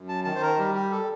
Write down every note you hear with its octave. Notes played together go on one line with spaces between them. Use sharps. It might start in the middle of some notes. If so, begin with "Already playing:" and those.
Already playing: F#2
A5
D#3 A5
C5
A#4
G3 G4
G4
A4